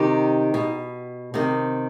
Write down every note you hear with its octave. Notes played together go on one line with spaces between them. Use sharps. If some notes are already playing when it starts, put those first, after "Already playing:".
Already playing: C3 D#3 D#4 G4
B2
C3 D#3